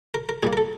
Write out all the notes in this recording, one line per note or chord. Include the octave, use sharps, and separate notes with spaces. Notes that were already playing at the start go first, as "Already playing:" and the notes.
A#4
A#4
A#2 G3 A#3 G#4
A#4
A4